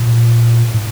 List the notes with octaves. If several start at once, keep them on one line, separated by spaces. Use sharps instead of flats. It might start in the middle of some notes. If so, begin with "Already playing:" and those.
Already playing: A#2
A2